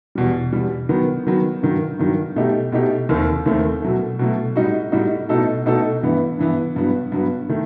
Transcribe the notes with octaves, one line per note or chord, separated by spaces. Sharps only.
E2 B2 G3
E2 B2 G3
D#3 F#3 B3
D#3 F#3 B3
G2 D#3 F#3
G2 D#3 F#3
B2 A3 D#4 G4
B2 A3 D#4 G4
D#2 D#3 A3 C4
D#2 D#3 A3 C4
B2 F#3 A3
B2 F#3 A3
A2 G3 D#4 F#4
A2 G3 D#4 F#4
B2 A3 D#4 F#4 A4
B2 A3 D#4 F#4 A4
G2 E3 B3
G2 E3 B3
G2 F#3 B3
G2 F#3 B3
D#3 A3